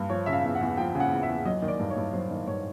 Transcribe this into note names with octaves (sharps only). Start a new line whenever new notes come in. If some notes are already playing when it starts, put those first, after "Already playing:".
Already playing: G2
F3 C#5
C#3 E5
F5
E2
F#5
E2
F3 G5
C#3
F#5
E2
E5
E2
F#3 D#5
D#3
D5
G2
C#5
G2
F#3 C5
D#3
G2 C#5